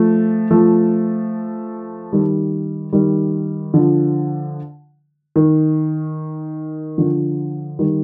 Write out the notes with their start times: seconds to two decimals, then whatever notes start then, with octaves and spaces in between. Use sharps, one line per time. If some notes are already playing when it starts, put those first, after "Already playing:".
Already playing: F3 A3
0.51 F3 A3
2.13 D#3 G3
2.93 D#3 G3
3.74 D3 F3
5.36 D#3
6.98 D3 F3
7.79 D#3 G3